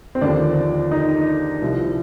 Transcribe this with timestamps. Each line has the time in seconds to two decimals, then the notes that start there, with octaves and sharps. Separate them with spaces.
0.15 C4
0.21 D#2 D3 F3 D4
0.91 D#4
1.61 C2 C3 F3